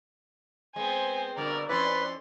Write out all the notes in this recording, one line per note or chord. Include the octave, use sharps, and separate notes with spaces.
G#3 B3 C4 C5 G#5
G2 B2 D3 A#4 D5
F2 C#4 E4 B4 C#5 D5 C6